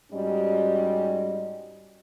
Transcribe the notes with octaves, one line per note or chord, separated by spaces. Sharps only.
G#2 G3 C#4 F#4 G4 D#5